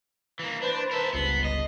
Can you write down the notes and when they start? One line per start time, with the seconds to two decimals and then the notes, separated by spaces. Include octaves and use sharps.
0.39 E3 A#3
0.62 D4 B4 C5 A5
0.91 A#4 E5
1.13 G1 C#2 B3 C7
1.44 D#5